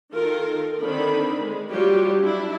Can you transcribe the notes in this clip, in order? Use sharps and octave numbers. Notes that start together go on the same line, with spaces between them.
D#3 F4 A4 A#4
D3 D#3 C4 D4 B5
G#3
F#3 G3 F4 G4
D4 E4